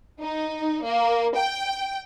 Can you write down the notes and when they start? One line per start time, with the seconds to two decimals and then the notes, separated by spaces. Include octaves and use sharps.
0.21 D#4
0.84 A#3
1.36 G5